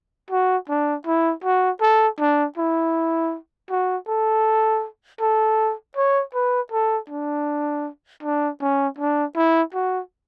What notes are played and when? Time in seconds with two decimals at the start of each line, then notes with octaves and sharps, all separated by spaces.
0.31 F#4
0.69 D4
1.07 E4
1.44 F#4
1.81 A4
2.19 D4
2.58 E4
3.70 F#4
4.08 A4
5.21 A4
5.96 C#5
6.34 B4
6.72 A4
7.10 D4
8.23 D4
8.61 C#4
8.98 D4
9.36 E4
9.74 F#4